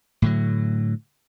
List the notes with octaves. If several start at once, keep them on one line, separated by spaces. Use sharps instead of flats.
A2 D3 F#3